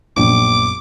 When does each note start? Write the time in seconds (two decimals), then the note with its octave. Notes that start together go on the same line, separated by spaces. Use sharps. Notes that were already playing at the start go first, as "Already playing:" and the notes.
0.17 A#1 F#2 B3 D6